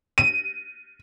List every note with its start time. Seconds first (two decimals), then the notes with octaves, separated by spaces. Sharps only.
0.18 D#7